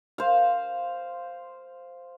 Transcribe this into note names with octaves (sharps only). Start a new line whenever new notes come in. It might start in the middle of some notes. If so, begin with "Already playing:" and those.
C5 F5